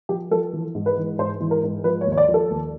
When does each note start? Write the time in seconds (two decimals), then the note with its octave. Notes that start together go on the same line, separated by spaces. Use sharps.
0.09 F3 G4
0.31 F3 A4
0.53 E3
0.75 G#2
0.86 B4
0.97 E3
1.18 G#2 C5
1.40 E3
1.51 A#4
1.63 G#2
1.84 F3 B4
2.01 C#5
2.06 D#2
2.12 C#5
2.18 D5
2.28 F3
2.34 A4
2.50 D#2